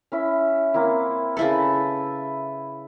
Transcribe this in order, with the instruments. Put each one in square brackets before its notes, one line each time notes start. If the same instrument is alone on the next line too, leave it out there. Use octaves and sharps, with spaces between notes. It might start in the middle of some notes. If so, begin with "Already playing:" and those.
[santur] C#4 E4 E5
A#3 C4 E4
[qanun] C#3 E4 A4 [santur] B4